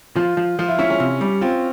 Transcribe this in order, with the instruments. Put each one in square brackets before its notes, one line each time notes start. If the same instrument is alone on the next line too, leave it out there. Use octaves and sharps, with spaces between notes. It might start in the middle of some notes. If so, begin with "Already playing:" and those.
[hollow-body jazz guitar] F3 [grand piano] F4
[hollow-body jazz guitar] F3
[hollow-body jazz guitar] F3 [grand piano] F4
[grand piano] E4
[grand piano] C#4 [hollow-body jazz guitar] E4
[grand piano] C#4
[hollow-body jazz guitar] C3
G3
[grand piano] C4 [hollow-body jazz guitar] F4